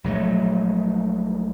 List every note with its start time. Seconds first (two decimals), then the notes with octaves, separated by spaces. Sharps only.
0.04 A#1 F#3 G#3 A3